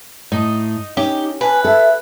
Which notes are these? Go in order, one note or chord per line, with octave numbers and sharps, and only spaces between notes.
A2 D#4
C#4 D#4 G4
B4 G#5
A4 E5